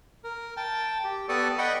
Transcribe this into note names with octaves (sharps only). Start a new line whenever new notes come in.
A#4
G5 A5
G4
B3 G4 A4 D5 C#6 D#6
D#5 F#5 G5 B5 C#6